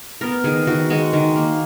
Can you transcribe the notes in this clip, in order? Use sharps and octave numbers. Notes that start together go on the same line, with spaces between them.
B3 A#4
D#3 G#4
D#3 F#4
G#3 F#4
D#3
A#3